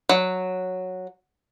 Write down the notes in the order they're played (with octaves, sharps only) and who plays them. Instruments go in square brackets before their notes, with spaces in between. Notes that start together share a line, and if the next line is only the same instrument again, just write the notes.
[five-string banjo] F#3